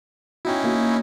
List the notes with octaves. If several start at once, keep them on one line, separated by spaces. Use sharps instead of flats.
C#4 D#4 E4 F#4 G5
A#3 F#4